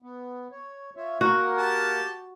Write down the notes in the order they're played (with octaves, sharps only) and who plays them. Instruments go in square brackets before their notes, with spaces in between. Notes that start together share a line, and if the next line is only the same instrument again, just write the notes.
[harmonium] B3
C#5
F4 C#5 E5
[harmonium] A#3 A#4 F#5 [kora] F#4
[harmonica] G4 A5